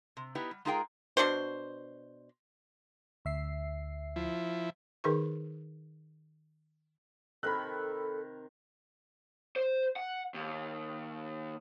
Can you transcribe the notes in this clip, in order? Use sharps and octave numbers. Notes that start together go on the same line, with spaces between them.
C3
B3 D#4 E4 G4 B4 D#5
G3
G#3 D#4 F4 G#4 A#4 G5
B2 D4 F#4 C5
D2 E5 C7
F3 E4
D#3 D#4 G#4 A#4 B4 C#6
C3 D#3 A4 A#4 B5 F#6
C5
F#5
D#2